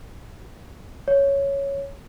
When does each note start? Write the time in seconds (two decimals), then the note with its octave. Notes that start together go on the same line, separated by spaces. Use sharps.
1.08 C#5